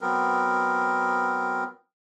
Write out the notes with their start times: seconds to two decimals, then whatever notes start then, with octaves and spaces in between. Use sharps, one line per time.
0.01 F#3 B3 C4 A#4